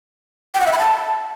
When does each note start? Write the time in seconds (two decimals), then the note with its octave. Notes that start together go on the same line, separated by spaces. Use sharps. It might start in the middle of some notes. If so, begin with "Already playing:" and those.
0.54 G5
0.60 F#5
0.67 E5
0.73 B5
0.79 A5